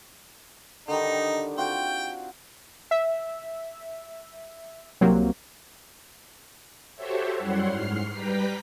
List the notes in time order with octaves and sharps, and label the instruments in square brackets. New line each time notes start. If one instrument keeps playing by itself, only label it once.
[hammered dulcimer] D3 D#3 G3 [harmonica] D#4
[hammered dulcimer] C4 F4 F#4 [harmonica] G5
[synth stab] E5
C2 C3 F#3 A#3 C4
[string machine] F#4 G4 A4 C5 C#5 E5
F#2 G3 E4 C#5 F#5 C6
G#2 F6 C7
G3 B4 G5 A#5 B6